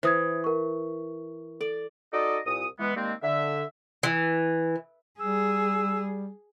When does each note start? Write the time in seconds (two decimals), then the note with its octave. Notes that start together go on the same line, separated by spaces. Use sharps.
0.03 E3 C5 D#6 G#6
0.44 A#4 C#6
1.61 A4 D5
2.13 D#4 F#4 A4 D5 D#5
2.46 C2 A#2 D#6
2.79 E3 G#3 B3
2.96 D#3 G3 G#3 A#3 C4
3.23 D3 E5
4.03 E3
5.20 G3 G#4 E6